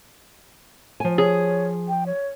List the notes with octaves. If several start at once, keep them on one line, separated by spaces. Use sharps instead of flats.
F3 G#5
G#4 C#5
G5
C#5